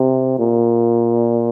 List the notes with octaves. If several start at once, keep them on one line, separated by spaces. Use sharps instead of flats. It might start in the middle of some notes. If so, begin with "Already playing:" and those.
Already playing: C3
A#2